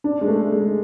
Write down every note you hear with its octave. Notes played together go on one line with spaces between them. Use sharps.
D4
G#3
A3
G#3